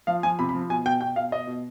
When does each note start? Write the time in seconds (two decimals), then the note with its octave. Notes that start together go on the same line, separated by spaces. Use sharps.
0.07 F3 F5
0.23 F3 G#5
0.39 C3 B5
0.49 B5
0.55 F3
0.69 B2 G#5
0.85 B2 G5
1.01 B2 G5
1.16 B2 F5
1.31 B2 D#5
1.47 B2